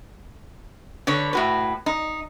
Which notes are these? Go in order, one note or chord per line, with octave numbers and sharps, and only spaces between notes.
D3 B4 C#5
A2 F#4 B4
D#4